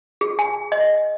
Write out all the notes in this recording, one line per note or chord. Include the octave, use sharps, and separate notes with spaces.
G#4
G#5
D#5